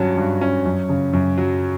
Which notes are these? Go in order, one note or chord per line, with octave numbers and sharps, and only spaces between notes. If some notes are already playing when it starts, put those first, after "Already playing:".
Already playing: G2 F#3 C#4 F#4
G2
C#4
F#2
C#3
F#2
F#3